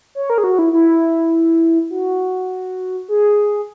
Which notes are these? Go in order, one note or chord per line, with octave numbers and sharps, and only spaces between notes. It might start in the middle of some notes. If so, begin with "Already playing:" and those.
C#5
A#4
G#4
F#4
E4
E4
F#4
G#4